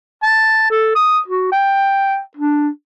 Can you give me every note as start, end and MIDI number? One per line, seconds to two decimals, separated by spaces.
0.23 0.69 81
0.71 0.91 69
0.95 1.19 87
1.28 1.48 66
1.52 2.20 79
2.37 2.69 62